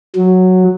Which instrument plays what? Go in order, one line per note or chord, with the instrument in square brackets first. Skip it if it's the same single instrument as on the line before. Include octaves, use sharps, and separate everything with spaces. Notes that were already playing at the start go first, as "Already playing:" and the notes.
[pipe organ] F#3